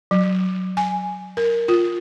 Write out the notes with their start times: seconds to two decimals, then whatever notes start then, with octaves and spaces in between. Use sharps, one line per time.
0.11 F#3
0.77 G#5
1.37 A#4
1.68 F4